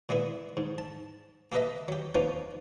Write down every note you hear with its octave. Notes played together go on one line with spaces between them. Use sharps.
A#2 G#3 B3 E4
G#2
A5
A#3 G4 A4 B4 D#5 E5
F#3 G4
F3 A#3 B3 C#4 D#4 F4